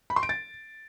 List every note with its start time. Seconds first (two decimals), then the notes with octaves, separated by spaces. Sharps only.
0.10 B5
0.16 C6
0.23 D7
0.29 A6